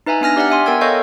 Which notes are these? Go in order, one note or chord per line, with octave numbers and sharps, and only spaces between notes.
D#4 B4 E5 G#5 A#5
B3 D4 G#5 F6 A#6
G4 D5 E5 F#5 F6
E5 G#5 C6
B3 A#4 G5 E6 G#6
A4 C#5 D#5 F5 C#6 G6